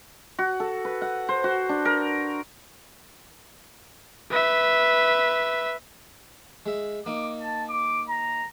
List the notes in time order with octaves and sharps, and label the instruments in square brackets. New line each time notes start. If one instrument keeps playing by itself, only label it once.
[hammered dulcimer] F#4
A4
B4
F#5
C5
F#4
D4
A#4
[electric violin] B4 E5
[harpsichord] G#3 E5
[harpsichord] A#3 D#4 [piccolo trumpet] D6
[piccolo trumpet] A5
D6
A#5